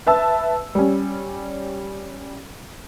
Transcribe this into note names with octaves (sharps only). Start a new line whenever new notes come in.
B4 E5 A5 E6
G3 C#4